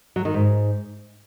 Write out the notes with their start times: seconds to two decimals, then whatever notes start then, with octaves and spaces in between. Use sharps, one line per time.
0.16 F#3
0.25 D#3
0.34 G#2